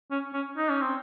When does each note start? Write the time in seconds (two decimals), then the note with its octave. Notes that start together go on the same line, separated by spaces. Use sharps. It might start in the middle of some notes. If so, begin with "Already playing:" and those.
0.11 C#4
0.33 C#4
0.57 D#4
0.70 C#4
0.81 C4